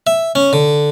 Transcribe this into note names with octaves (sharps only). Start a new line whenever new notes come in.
E5
C#4
D3